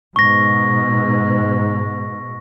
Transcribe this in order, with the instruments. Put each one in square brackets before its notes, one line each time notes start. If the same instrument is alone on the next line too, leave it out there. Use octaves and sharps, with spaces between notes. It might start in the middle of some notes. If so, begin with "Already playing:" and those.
[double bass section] G#2 B2 [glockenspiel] C#6 A#6